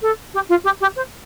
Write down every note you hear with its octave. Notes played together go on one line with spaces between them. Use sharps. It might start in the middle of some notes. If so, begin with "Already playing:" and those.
A4
G4
F4
G4
G4
C5